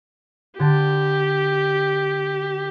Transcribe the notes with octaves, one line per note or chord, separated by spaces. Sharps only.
D3 G4 A5